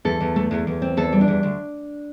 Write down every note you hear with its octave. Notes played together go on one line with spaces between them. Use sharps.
E2 A4
E2
A3
E2
E2
C4
E2 A4
G3
D4
E2
D2